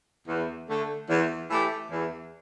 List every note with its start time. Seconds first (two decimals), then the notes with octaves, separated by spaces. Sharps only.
0.28 E2
0.68 D3 A3
1.09 E2
1.50 E3 A3 E4 G4
1.90 E2